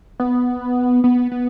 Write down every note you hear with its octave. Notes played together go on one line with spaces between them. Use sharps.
B3
B3
B3